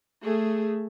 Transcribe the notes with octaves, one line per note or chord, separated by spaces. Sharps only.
A3 G#4